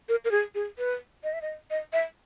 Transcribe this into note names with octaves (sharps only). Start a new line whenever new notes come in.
A#4
A#4
G#4
G#4
B4
D#5
E5
D#5
D#5
E5